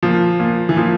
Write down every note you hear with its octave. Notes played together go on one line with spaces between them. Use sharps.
A#2 F3
A#2
E3
A#2 F3